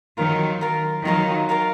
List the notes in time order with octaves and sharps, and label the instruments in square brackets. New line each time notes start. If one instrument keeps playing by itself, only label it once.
[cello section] D#3 F#3 [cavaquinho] F4 A#4 F5
[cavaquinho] F4 A#4 F5
[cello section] D#3 F#3 [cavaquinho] F4 A#4 F5
[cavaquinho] F4 A#4 F5